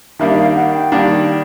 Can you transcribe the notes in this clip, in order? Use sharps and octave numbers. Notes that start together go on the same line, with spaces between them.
D#3 G3 A#3 D4 E5
E5
F5
F#5
G5
D#3 G3 A#3 D4